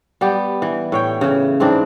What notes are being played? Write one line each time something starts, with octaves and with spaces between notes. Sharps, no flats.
G3 B3 G4
E3
A2 C#5 G5
C#3 E3
G#2 E3 C4 D4